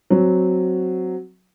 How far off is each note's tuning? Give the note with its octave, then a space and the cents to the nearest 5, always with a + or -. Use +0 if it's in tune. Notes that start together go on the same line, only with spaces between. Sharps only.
F#3 +0 C4 +0